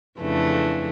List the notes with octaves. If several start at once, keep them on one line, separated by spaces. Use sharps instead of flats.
F2 C#3 E3 A3 D4